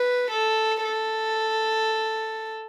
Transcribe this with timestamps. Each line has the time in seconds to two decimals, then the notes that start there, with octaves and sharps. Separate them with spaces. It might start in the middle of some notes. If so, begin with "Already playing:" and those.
Already playing: B4
0.31 A4
0.84 A4